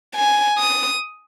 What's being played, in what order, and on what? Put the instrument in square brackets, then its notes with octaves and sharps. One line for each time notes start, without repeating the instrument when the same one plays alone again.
[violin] G#5
D#6